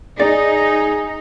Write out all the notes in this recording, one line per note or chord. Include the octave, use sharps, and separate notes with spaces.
D#4 G#4 D5